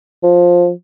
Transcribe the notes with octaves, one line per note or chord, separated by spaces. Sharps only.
F3